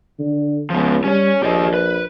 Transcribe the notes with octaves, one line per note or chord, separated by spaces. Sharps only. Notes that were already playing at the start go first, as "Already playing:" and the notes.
D3
C#2 F3 B3
G3 C#4 C#5
A#1 G4 D5 D#5
B4